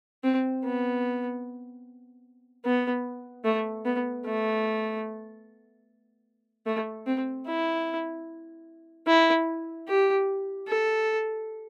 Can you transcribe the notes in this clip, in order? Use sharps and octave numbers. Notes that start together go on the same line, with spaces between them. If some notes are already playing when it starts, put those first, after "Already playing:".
C4
B3
B3
A3
B3
A3
A3
C4
E4
E4
G4
A4